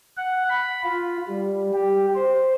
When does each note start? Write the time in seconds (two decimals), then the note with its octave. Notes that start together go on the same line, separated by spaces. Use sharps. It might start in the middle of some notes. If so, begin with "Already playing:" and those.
0.17 F#5
0.49 B5
0.84 F4
1.28 G3
1.74 G4
2.15 C5